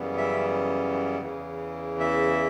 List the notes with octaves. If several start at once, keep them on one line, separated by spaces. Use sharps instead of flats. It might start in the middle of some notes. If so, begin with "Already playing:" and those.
Already playing: F#2 C#3 E3 G3 B3
E5
E2 C#3 E3
E5